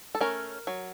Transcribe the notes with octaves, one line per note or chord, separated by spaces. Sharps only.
A4
A3 C#4 A#4
F#3